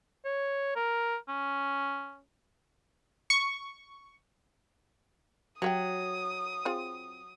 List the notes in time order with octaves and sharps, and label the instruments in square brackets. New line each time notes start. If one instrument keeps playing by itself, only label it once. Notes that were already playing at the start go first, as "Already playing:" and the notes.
[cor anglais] C#5
A#4
C#4
[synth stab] C#6
[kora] F#3 [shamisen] G4 E5 G5 [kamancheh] D#6
[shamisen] C4 F4 G#4